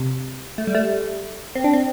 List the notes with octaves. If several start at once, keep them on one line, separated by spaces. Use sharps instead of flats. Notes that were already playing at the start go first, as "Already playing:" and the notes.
Already playing: C3
A3
G3
A3
C4
D4
C4